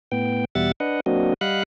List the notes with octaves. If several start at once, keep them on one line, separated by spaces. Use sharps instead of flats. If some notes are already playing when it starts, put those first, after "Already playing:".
A2 B3 G5
E2 B2 G3 E5 F#5 A6
D4 B4 D#5 F#5
F#3 A#3 C4 D4 F#4 D#5
G3 D#5 F5 F#5 B5 F#6